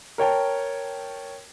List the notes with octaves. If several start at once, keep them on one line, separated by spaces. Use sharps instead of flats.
A#4 C#5 G5 A5